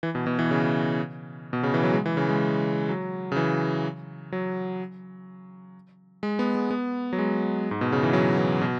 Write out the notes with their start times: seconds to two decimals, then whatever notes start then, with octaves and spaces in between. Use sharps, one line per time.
0.03 E3
0.15 B2
0.27 B2
0.39 E3
0.51 C#3
1.53 B2
1.63 C#3
1.74 E3
1.83 F#3
1.94 G#3
2.06 E3
2.17 C#3
2.29 G#3
2.89 F#3
3.32 C#3
3.36 E3
4.32 F#3
6.23 G#3
6.39 B3
6.55 G#3
6.71 B3
7.13 F#3
7.19 G#3
7.71 G#2
7.81 B2
7.92 C#3
8.03 E3
8.13 F#3
8.38 E3
8.61 B2